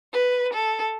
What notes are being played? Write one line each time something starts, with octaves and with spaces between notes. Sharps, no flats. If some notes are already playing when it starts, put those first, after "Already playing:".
B4
A4